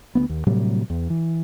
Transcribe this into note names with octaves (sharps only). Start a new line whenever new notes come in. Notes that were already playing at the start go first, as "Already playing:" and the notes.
D2 A#3 B3
D#2
A2 C3 F#3 G3
E2
E3